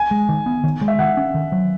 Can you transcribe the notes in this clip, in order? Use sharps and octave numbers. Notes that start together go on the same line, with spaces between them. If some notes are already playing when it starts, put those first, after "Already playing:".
Already playing: G#5
G#3
D#3
B3
D#3
G#3
E5
D#3 F#5
C#4
D#3
F#3